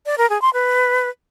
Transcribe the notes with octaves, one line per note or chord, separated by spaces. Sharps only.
D5
A#4
G#4
C6
B4